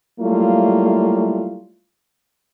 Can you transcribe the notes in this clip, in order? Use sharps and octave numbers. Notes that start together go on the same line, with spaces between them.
F#3 G3 A3 A#3 E4 F4